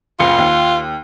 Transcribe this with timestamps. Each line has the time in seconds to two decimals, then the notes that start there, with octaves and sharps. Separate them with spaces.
0.20 F#1 C#2 F4 C#7
0.38 D#2